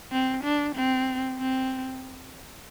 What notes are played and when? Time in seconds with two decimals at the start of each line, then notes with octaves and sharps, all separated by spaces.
0.12 C4
0.44 D4
0.75 C4
1.39 C4